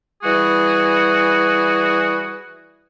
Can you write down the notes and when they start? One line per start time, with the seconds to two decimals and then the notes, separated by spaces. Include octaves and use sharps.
0.23 E3 G3 F#4 G#4